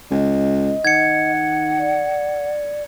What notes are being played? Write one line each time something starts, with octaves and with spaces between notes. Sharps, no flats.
C#2 D#5
D#3 F#5 G#6 C#7
D5